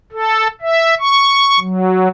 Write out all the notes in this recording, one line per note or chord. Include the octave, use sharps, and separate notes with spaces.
A4
E5
C#6
F#3